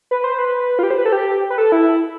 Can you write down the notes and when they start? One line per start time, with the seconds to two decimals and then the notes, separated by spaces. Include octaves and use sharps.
0.11 B4
0.24 C5
0.38 B4
0.79 F4
0.83 G4
0.90 C5
0.98 B4
1.06 A4
1.13 G4
1.50 B4
1.58 A4
1.72 E4